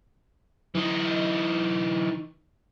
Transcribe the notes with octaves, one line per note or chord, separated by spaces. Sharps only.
E3 D#4